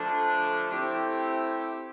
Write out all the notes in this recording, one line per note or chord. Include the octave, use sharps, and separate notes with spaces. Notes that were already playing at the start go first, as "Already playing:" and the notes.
Already playing: D3 F3 A3 D4
A3 C4 E4 G4